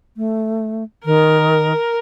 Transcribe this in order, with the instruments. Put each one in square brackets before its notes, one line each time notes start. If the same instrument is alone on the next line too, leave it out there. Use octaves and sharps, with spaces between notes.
[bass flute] A3
[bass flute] D#3 [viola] A#4